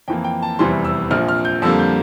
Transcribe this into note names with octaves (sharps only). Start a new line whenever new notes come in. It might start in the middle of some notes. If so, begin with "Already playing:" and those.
F2 E3 A#3 G5
G5
A5
F1 E2 C3 E3 G3 C6
E6
A#1 A#2 F3 F6
F6
G6
F2 D3 G3 A#3 E6
G6